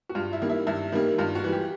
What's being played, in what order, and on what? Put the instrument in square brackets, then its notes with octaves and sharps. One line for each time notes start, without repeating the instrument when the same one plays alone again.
[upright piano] F#4
G2 F4
E4
D#3 G3 A#3
E4
G2 E4
D#3 G3 A#3
G2 F4
F#4
E3 G3
G4